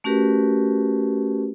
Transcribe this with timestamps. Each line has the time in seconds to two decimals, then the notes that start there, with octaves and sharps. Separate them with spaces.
0.04 A3 C#4 F#4 G4 A#4 B4